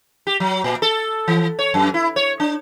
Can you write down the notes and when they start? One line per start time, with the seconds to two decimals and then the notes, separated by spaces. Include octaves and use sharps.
0.27 G4
0.40 F#3
0.64 A#2
0.82 A4
1.28 E3
1.59 C#5
1.74 F#2
1.94 E4
2.16 C#5
2.40 D4